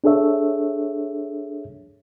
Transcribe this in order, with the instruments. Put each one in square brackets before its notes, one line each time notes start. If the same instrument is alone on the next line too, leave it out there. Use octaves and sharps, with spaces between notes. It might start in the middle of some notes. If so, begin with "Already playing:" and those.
[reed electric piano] D4 G#4 A4 C#5 E5